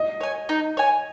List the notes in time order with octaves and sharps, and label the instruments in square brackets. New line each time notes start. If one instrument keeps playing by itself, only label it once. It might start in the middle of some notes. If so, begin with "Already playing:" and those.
Already playing: [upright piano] D#5
[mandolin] C#5 G#5
D#4
C#5 G#5